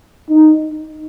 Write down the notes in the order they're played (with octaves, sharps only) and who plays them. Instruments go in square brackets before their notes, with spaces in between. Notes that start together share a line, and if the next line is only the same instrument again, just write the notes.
[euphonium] D#4